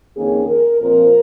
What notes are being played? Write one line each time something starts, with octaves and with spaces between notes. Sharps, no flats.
F2 D#3 A#3 C#4 G#4
A#4
A#2 F3 C4 A#4